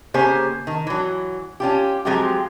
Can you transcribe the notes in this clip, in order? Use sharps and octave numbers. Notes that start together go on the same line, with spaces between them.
C#3 A#3 G4 C5 G#5
D#3
E3 F#3
C#4 F4 G4
F3 F#3 G#3 C4 F4 G4